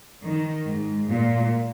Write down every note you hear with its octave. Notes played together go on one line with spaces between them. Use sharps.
D#3
G#2
A#2